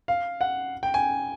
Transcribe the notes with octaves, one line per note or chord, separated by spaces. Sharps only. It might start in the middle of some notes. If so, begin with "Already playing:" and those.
F5
F#5
G5
G#5